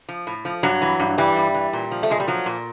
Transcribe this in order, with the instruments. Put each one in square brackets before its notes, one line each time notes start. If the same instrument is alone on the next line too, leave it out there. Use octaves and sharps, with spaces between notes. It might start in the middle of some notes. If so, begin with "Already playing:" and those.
[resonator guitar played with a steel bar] F3
A2
F3
G2 F#3
E3
G2
E3 G3
G2
E3
A#2
F3
A3
A#2 G#3
G3
F3 F#3
A#2